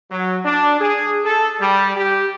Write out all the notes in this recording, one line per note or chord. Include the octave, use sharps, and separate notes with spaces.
F#3
D4
G#4
A4
G3
G4